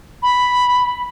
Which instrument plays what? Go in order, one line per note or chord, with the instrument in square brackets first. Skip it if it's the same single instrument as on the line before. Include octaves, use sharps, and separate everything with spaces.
[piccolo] B5